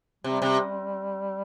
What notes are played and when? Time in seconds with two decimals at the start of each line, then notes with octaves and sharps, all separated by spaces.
0.24 C3 G3
0.42 C3